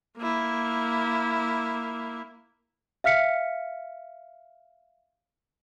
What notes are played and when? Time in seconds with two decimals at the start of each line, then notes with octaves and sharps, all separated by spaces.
0.17 A#3 E4
3.04 E5 F5 F6 B6 C#7